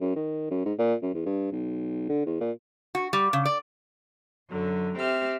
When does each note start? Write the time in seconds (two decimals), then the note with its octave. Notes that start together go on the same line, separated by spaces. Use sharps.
0.01 F#2
0.16 D#3
0.51 F#2
0.65 G#2
0.79 A#2
1.02 F#2
1.14 E2
1.25 G2
1.52 B1
2.09 D3
2.26 E2
2.40 A#2
2.95 F#4
3.13 G3
3.33 C#3
3.46 D5
4.50 F#2 D3 F#3
4.96 C4 G4 E5 F6